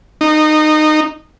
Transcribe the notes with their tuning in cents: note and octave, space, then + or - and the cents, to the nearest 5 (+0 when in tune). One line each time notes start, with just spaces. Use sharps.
D#4 -20